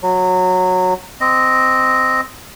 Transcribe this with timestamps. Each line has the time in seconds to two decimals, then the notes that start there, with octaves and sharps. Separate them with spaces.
0.03 F#3
1.20 C4 D#5